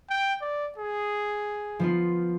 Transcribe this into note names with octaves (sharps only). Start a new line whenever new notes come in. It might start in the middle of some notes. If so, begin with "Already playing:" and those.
G5
D5
G#4
F3 B3 F4